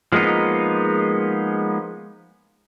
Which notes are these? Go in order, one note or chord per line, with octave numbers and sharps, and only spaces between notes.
F3 G#3 A#3 B3 D#4